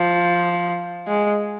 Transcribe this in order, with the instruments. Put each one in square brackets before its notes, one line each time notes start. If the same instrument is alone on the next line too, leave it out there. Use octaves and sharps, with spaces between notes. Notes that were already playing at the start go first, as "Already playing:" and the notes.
Already playing: [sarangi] F3
G#3